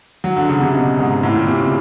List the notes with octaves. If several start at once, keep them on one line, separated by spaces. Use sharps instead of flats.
F#3
D3
C#3
C3
B2
G#2
A2
A#2
C3
C#3